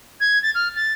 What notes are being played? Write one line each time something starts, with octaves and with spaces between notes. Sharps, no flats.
G#6
A6
F6
A6